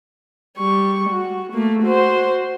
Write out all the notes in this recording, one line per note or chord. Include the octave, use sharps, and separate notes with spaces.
G3 C#6
F#4
A3 A#3
F#4 C5